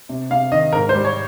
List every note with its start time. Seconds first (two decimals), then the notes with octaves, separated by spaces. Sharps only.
0.09 C3
0.30 C3 F5
0.52 D#3 D#5
0.73 G#2 A#4
0.89 C5
0.94 G3
1.05 C#5